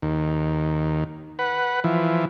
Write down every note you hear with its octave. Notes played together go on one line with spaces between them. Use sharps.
D#2
B4 F#5
E3 F3